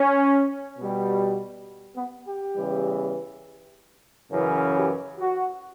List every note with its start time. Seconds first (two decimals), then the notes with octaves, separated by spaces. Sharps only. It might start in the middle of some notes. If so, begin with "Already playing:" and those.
Already playing: C#4
0.79 B2 G3
1.96 B3
2.26 G4
2.55 E2 C#3 E3 G3
4.32 F#2 C#3 E3
4.76 G4
5.20 F#4